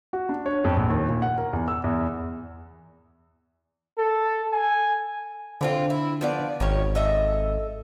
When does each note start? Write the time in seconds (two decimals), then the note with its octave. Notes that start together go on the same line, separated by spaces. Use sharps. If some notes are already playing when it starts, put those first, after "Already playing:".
0.13 F#4
0.29 D4
0.46 C#5
0.64 F2
0.77 A#1
0.90 D#2
1.08 A#2
1.22 F#5
1.38 A#4
1.53 E2
1.68 E6
1.84 E2
3.98 A4
4.52 G#5
5.61 D3 E3 C4 F4
5.90 E4
6.21 F3 B3 D5
6.60 G#1 D#3 C#4 C#5
6.95 A4 D#5 E5